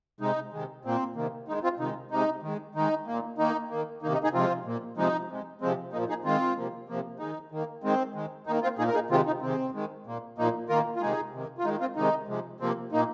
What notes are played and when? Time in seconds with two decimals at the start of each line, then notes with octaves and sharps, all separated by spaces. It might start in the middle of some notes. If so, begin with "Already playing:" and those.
0.20 C3 G#3 D#4
0.52 C3 D#3 G#3
0.85 A#2 A#3 C4
1.16 C3 D#3 A#3
1.48 D#3 G#3 D#4
1.63 C4 F4
1.80 C3 D#3 G#3 D#4
2.11 C3 G#3 D#4
2.43 D#3 G#3
2.75 D#3 G#3 D#4
3.07 A#2 A#3
3.38 D#3 A#3 D#4
3.70 D#3 A#3
4.02 C3 D#3 A#3 D#4
4.13 D#4
4.24 D#4 G#4
4.33 C3 F3 G#3 C4 F4
4.65 A#2 A#3
4.97 C3 F3 G#3 D#4
5.29 C3 G#3
5.61 C3 F3 G#3 C4
5.93 A#2 F3 A#3 D#4
6.09 D#4 G#4
6.24 D#3 G#3 C4 F4
6.56 C3 F3 A#3
6.89 C3 F3 A#3
7.19 D#3 G#3 D#4
7.52 D#3 A#3
7.83 D#3 G#3 C4
8.15 D#3 G#3
8.47 D#3 D#4
8.50 A#3
8.63 C4 F4
8.78 A#2 A#3 D#4 G#4
8.88 A#4
8.94 D#4 G#4
9.10 C3 D#3 G#3 C4 F4
9.27 D#4
9.42 C3 D#3 G#3 C4
9.74 D#3 G#3
10.07 A#2 A#3
10.38 A#2 F3 A#3 D#4
10.69 D#3 A#3 F4 A#4
10.96 F4
11.01 C3 D#3 G#3 D#4 G#4
11.33 C3 D#3 A#3
11.58 F4
11.64 D#3 G#3 D#4
11.80 C4 F4
11.96 C3 D#3 G#3 D#4
12.28 C3 F3 G#3
12.60 C3 F3 A#3 C4
12.92 A#2 A#3 D#4